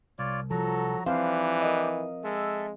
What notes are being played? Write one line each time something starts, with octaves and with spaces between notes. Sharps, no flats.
C2 F4 C#5 D5
F3 F#3 F#4 A4 A#5
E3 G3 C4 D4 G4 C5 F5
A#4 D#5
G#3 A4 E5